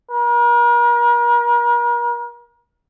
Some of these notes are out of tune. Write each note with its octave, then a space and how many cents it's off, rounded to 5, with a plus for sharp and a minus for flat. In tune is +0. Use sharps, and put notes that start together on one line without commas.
A#4 +40